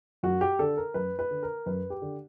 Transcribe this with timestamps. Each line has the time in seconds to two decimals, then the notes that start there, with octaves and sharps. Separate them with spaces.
0.23 F#2 F#4
0.41 G4
0.59 D3 A4
0.77 A#4
0.94 F#2 B4
1.19 B4
1.31 D3
1.43 A#4
1.66 F#2 B4
1.90 G4
2.02 D3